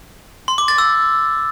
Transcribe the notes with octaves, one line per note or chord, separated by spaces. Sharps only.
C6
D6
A6
E6